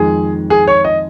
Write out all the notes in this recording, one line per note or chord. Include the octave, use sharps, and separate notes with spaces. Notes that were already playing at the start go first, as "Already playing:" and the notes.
Already playing: F2 D#3 G#3 G#4
G#4
C#5
D#5